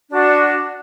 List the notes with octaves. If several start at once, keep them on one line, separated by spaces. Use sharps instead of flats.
D4 F#4